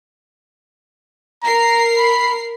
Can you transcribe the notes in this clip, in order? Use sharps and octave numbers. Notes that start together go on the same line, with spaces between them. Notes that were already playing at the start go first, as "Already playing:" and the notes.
A#4 A#5 C7
B5